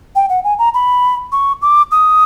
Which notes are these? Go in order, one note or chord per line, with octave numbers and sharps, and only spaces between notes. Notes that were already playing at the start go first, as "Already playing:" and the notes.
G5
F#5
G#5
A#5
B5
C#6
D6
D#6